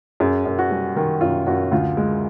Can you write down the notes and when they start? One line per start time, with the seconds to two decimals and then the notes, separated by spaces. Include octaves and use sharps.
0.20 F#2 G#4
0.46 F#2
0.58 F#4
0.71 G3
0.96 D#3
1.21 F#2 F4
1.47 F#2 F#4
1.71 D2 F4
1.97 G#3